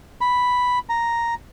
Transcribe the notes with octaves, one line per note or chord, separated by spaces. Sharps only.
B5
A#5